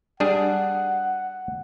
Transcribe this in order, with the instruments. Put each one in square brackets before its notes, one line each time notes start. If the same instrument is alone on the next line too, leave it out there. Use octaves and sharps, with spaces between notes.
[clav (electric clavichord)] G3 D4 G#4 [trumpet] F#5